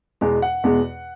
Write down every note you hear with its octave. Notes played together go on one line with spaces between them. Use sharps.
E2 B2 G#3
F#5
E2 B2 G#3